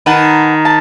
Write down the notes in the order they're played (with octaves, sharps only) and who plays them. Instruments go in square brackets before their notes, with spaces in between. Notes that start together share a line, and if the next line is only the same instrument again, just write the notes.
[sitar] D#3 [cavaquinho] B4 F#5 A5
[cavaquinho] A5